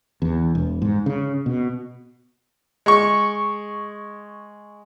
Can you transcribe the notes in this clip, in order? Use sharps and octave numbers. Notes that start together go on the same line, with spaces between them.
E2
E1
G#2
C#3
B2
G#3 C#6